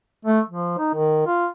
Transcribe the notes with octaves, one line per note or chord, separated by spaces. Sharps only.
A3
F3
D#4
D#3
F4